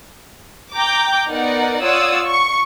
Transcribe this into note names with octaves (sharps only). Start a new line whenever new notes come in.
G5 A#5 D6 G6
B3 D#4 A#4 D5 F#5
F4 C#5 D5 F#5 D#6 E6
C#6